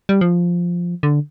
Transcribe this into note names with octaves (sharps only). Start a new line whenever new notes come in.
G3
F3
D3